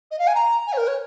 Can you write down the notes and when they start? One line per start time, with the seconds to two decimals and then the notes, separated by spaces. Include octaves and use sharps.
0.11 D#5
0.19 F5
0.27 G#5
0.35 A#5
0.67 G#5
0.73 C#5
0.77 A#4
0.88 C#5